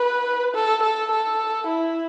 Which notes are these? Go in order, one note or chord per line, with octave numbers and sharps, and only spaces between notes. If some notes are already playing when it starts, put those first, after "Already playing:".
Already playing: B4
A4
A4
A4
E4